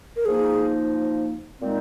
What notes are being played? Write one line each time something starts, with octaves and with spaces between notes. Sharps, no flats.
A#4
F3 A#3 D#4 G#4
A#2 G#3 C4 D#4